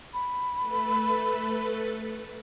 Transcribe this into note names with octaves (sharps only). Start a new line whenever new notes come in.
B5
A3 A4 B4